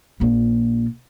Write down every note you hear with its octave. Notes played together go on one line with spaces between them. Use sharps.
A#1 A#3